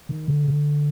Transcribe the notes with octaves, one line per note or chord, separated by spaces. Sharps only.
D#3
D3
D3